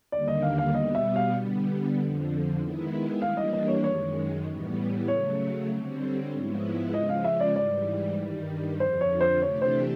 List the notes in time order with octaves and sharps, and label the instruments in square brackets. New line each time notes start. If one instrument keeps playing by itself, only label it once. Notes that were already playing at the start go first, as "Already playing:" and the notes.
[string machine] D#2 D3 G3 A#3 [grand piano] D5
[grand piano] D#5
F5
F5
[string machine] B2 G3 B3 [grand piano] D#5
[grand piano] E5
F5
[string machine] D3 G3 B3
F2 D3 F3
D#3 G#3 B3 E4
[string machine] E3 G3 A#3 D4 [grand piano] F5
[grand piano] D#5
D#5
C#5
[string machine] F#2 D#3 G#3 [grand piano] C#5
[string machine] A2 E3 G3 B3
[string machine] C#3 F#3 A3 [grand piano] C#5
[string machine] D3 G3 C4
G#2 F3 G#3 B3 E4
[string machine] C#3 F3 G#3 [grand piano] D#5
[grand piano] F5
E5
D5
[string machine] G#2 E3 G3 [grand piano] D5
[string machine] G2 D#3 G3
[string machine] F2 D3 F3 [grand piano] C5
[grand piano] C#5
C5
[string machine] C3 E3 A3 D4 G4 [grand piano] C#5
[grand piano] C5